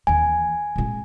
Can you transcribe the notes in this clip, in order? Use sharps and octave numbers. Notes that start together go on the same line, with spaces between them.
D#2 E3 G#5
A#2 G#3